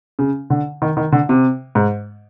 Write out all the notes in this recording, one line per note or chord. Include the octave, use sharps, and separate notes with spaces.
C#3
D3
D#3
D#3
D3
C3
G#2